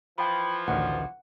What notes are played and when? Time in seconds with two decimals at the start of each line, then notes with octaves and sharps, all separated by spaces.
0.18 E3 F3 G5 B5
0.68 A1 D2 D#3 F#5